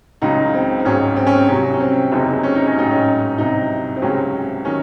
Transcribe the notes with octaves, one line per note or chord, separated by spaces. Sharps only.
C#2 C#3 F#3 D#4
C4
C4
G#1 G#2 F#3 C#4
C4
C#4
C4
C2 C3 F#3 C#4
C#4
C4
F#1 E2 C3 F#3 D#4
C#4
D#4
C#4
A1 G#2 F#3 D#4
C#4
C2 C3 F#3 D#4
C4
C#2 C3 F#3 C#4
D#3 F#3 C#4